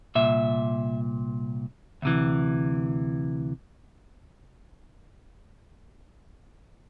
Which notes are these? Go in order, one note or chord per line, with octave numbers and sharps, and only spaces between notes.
C2 A#2 E5
D2 C3 E3